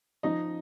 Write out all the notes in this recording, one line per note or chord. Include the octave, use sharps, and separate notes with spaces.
F3 D#4 D#5